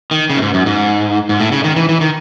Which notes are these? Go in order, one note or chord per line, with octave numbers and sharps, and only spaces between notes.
D#3
C#3
F#2
G#2
F#2
G#2
G#2
A2
C#3
D#3
E3
E3
D#3